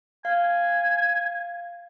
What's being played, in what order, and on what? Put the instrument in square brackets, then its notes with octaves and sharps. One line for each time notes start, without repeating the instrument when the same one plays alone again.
[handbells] F5 [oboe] G#5